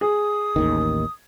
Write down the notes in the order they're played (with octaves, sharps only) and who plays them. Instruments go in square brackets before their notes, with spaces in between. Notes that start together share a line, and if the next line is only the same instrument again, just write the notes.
[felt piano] G#4 [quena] D#6
[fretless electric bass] A1 D#2 D#3